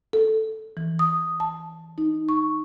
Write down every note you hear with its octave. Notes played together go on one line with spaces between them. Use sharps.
A4
E3
D#6
A5
D#4
C#6